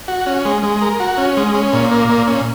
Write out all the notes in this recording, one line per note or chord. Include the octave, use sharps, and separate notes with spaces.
F#4
C#4
G#3
G#3
A#4
F#4
C#4
G#3
C#4
A#2
A#3
A#2
C#4